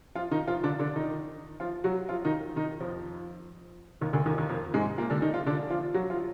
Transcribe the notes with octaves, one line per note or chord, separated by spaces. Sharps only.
F3 F4
D#3 D#4
F3 F4
D3 D4
D3 D4
D#3 D#4
F3 F4
F#3 F#4
F3 F4
D#3 D#4
D#3 D#4
F2 F3
D#2 D#3
D2 D3
D#2 D#3
D#2 D#3
F2 F3
G#2 G#3
A#2 A#3
D3 D4
D#3 D#4
F3 F4
D3 D4
F3 F4
F#3 F#4
F3 F4